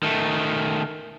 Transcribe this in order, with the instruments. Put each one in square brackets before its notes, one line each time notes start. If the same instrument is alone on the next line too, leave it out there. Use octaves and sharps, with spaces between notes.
[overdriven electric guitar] D#3 A3